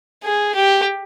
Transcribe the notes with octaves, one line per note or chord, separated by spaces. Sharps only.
G#4
G4